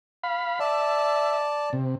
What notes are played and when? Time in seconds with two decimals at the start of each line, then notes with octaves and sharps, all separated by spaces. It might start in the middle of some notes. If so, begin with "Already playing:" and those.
0.23 F5 B5
0.60 D5 E5 A5
1.73 C3